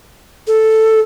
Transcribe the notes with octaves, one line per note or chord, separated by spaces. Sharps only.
A4